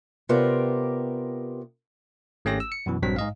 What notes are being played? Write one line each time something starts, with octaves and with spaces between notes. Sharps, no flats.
C3 B3 F4 G4 A#4 D5
G#1 A3 C#4 G4 A#6
E6
C#7
F#2 B2 E3
A#1 G2 F#3 C4 B6
G#2 D#5 F5